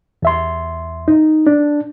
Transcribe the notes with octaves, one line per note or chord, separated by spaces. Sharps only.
E2 E5 C6
D#4
D4